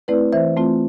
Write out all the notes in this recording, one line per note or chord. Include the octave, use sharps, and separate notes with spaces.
A3 C4 E4 B4 D5
E3 C5 E5
A3 C4 F4